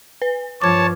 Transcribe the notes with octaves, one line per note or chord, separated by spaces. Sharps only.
B4
G2 F3 C#5 A5 D6 G#6